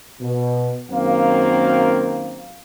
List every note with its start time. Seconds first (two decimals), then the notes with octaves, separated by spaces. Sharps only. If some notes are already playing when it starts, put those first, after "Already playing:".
0.20 B2
0.90 F#2 D#3 A#3 C4 F5